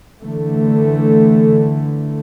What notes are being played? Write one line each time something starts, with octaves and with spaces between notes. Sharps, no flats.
D3 E3 A3